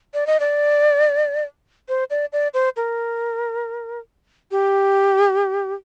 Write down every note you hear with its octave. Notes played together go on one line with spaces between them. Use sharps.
D5
D#5
D5
C5
D5
D5
C5
A#4
G4